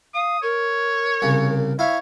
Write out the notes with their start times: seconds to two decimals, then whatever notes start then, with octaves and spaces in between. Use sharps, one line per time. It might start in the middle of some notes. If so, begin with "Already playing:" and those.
0.14 F5 D#6
0.42 A#4 C#5
1.22 C2 C#3
1.79 E4 C#5 E5 F5